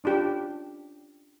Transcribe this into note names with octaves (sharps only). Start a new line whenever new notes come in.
C#4 D4 F4 G4